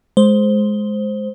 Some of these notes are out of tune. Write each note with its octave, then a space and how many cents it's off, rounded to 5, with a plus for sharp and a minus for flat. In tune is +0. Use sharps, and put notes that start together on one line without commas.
G#3 +15 C5 +0